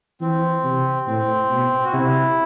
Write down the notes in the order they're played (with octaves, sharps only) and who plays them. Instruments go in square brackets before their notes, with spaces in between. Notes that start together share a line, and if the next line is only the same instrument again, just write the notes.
[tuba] E3 [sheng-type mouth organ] C4
[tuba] C3
[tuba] A2 [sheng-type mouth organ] C4
[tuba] B2
[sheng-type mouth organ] F#4
[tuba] C3 [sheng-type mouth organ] E4